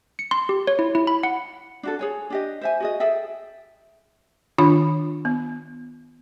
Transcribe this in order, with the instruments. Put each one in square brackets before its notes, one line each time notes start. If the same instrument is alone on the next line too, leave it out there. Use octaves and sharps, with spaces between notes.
[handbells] C#7
C6
G4
C#5
E4
E4
B5
F#5
[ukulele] D4 F#4 A4
G#4 C#5 G#5
D4 G4 D#5
C5 E5 G#5
F#4 G#4 D#5
G#4 A4 E5 G5
[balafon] D#3 D4 F4 B5
B3